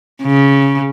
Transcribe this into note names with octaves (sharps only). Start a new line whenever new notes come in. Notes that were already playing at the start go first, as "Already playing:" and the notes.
C#3